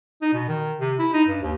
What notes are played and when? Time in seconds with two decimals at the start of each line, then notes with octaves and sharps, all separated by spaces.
0.22 D#4
0.33 B2
0.48 D#3
0.80 C3
0.99 E4
1.13 D#4
1.28 G2
1.42 D#2